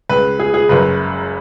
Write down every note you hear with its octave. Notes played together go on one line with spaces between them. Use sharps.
C#2 C#3 B4
G#4
G#4
F#1 F#2 C#3 B4